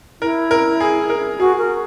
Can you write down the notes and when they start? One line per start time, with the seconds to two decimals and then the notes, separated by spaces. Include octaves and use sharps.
0.21 E4 A#4
0.51 A#4
0.80 G#4
1.10 A#4
1.39 F#4 G#4
1.58 A#4